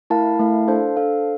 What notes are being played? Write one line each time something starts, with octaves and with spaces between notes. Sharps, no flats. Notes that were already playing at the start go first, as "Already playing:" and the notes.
A3 E4 A#4 F5 A5
A3 E4 A#4 F5 A5
D4 A4 C5 F5
D4 A4 C5 F5